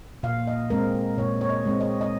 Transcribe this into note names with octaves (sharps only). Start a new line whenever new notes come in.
A#2 F5
D#5
G#3 C4 A#4
A#2 C#5
C#5
D#5
G#3 C4
D#5
D#5